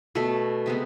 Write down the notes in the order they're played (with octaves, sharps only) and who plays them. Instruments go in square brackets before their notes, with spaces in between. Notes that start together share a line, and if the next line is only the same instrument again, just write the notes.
[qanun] B2 A3 A4
C3 G#3 B3